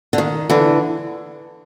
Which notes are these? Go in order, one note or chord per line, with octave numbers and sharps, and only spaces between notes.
D3
D#3
D3 E3